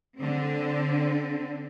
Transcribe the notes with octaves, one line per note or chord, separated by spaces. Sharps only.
D3 C4